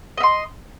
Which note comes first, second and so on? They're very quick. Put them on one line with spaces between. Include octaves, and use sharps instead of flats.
D#5 E5 C6